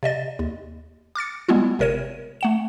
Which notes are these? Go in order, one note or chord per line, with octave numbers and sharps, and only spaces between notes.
C3 D5 D#5 A6
D#2
D6 F6 A6 C#7
G3 G#3 B3 E4 F4
G1 C3 A#4 C#5 D#7
A3 F#5 E7